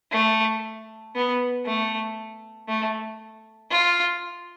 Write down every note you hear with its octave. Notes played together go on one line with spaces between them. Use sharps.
A3
B3
A3
A3
F4